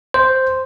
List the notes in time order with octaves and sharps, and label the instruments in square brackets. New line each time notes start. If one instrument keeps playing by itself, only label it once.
[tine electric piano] C5